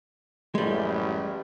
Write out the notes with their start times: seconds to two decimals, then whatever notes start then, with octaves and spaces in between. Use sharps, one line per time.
0.55 A1 F#2 A2 G3 G#3